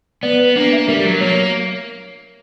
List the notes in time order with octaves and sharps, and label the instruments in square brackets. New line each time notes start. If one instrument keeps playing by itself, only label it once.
[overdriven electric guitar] B3 [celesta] D5
[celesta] B4
[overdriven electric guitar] A#3 [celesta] D4
[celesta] E5
[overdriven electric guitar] G3 [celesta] A#4
[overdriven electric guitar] F#3 [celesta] A#4
[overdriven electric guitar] A#3 [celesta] C#5